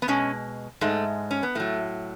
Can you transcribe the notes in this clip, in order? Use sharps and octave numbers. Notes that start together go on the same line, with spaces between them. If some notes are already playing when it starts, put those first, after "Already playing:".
B3
B2 G#3 C#4
G#2 G#3 A3
C#4
B3
A2 F#3 A3